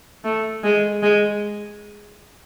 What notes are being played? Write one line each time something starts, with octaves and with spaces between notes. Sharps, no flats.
A3
G#3
G#3